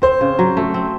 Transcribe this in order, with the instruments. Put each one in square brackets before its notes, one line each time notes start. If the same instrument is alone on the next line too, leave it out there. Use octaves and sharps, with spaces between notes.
[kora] C4 [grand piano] C5
[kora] C#3
F#3
A3
C4